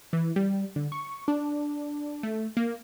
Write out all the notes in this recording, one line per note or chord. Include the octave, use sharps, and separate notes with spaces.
E3
G3
D3
C#6
D4
A3
A#3